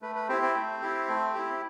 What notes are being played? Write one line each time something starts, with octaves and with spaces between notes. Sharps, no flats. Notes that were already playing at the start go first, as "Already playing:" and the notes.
A3 B4
B4
C4 E4 G4 C5
C4 C5
A3
E4 G4
A3
E4 G4